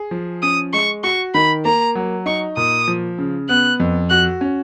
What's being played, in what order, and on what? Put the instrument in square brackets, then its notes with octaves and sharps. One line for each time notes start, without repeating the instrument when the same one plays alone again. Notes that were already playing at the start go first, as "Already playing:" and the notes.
Already playing: [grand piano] G#4
F3
[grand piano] C#4 [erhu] D#6
[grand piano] G#3 [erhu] C#6
[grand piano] F#4 [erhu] C#6
[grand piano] D#3 [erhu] B5
[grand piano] A#3 [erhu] A#5
[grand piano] F#3
[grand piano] D#4 [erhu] C#6
[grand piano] A#2 [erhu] D#6
[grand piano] F3
C#3
[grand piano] B3 [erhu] F#6
[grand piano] F2
[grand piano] F#4 [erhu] F#6
[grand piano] C#4